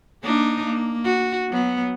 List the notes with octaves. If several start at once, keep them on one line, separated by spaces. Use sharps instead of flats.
A#3 D4 D#4
A#3
F#4
F#3 B3